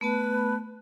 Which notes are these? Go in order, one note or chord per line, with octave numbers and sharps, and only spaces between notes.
A3 B3 B4 A5